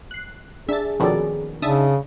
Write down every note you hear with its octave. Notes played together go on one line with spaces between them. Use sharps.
F#6 C7
D4 G#4 E5 A6
A#1 B2 D#3 C#4 A4 D5
C#3 D4 D#4 E5 A5 D#6